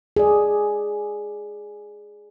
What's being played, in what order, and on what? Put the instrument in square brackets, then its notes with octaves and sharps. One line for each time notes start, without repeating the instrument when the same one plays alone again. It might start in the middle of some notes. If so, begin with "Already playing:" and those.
[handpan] G#4 D5